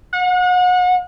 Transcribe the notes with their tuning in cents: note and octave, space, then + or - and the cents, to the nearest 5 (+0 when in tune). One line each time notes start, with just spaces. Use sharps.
F#5 -35